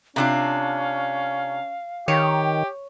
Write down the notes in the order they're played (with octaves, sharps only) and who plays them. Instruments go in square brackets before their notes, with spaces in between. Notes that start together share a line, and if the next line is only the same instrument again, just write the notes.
[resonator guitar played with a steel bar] C3 D4 F4 [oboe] C#4 [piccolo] F5
[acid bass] D#3 [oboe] G4 [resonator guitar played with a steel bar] C#5